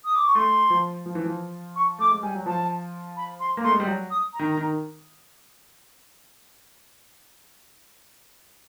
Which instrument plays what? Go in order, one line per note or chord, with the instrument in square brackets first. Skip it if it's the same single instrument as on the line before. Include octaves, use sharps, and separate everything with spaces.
[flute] D#6
D6
C#6
[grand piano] A3 [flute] C6
[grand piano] F3
F3
E3
F3
[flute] C#6
[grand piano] A3 [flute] D6
[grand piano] G#3
[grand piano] G3 [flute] G#5
[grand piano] F#3
[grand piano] F3 [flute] A5
[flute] B5
C6
[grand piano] A#3
[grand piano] A3 [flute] C6
[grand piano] G#3
G3
F#3
[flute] D#6
A#5
[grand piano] D#3
D#3